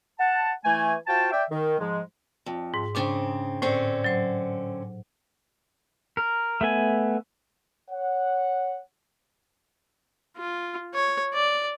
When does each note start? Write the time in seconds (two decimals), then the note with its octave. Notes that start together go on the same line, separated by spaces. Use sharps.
0.19 F#5 A5
0.65 E3 A3 G#5
1.07 F4 F#4 C5 F5 G5 A5
1.32 D5 E5 G5
1.51 D#3
1.79 G#2 F3 G#3
2.46 F2
2.74 G#2
2.95 G#2 C#3 C4 D4 C#6
3.62 A2 D3 C4 C#4
4.04 F#3 C5
6.17 A#4
6.61 A3 B3 G#5
7.90 C#5 F#5
10.37 F4
10.94 C#5
11.34 D5